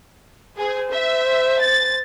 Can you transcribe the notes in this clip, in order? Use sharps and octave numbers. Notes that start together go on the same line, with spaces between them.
G#4 C5
E5
A6